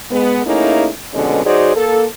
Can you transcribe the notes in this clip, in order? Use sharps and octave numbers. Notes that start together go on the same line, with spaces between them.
G#3 B3
A3 A#3 C#4 D#4 E4 G#4
F2 B2 D3 G#3 B3 C#4
F#3 D#4 F#4 G#4 C5 D5
A#3 A4